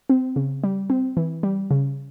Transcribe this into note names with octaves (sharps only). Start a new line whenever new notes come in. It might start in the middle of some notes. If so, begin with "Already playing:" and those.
C4
C#3
G3
C4
E3
G3
C#3